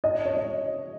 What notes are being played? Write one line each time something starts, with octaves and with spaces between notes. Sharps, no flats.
D#5
C#5
D#5